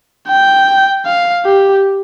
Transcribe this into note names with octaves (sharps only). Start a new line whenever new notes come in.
G5
F5
G4